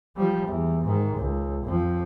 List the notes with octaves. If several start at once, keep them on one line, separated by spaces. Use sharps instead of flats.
F3 G3
E2
G#2 D#3
C#2
F2 F3